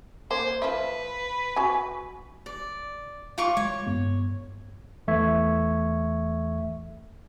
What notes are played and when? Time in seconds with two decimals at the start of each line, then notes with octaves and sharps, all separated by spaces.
0.31 A#3 C5
0.62 F3 B4 E5
1.56 F#4 G#5
2.46 D5
3.38 F4 C#6 D6
3.57 G#3 C#5
3.87 G2 B3
5.07 E2 E3 A3 E5 C#6 G#6